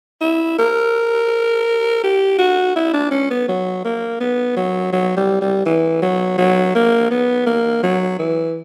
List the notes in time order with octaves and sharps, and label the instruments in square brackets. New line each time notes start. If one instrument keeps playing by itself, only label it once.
[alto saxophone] E4
A#4
G4
F#4
E4
D4
C#4
B3
F#3
A#3
B3
F#3
F#3
G3
G3
E3
F#3
F#3
A#3
B3
A#3
F#3
E3